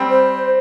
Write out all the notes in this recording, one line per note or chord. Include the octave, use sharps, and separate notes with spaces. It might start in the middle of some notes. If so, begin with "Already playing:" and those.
Already playing: G3 C4
C5